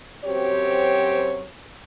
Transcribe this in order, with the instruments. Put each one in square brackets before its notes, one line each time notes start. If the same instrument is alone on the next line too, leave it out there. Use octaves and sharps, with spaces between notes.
[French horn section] F#2 F#3 C4 G4 C5 C#5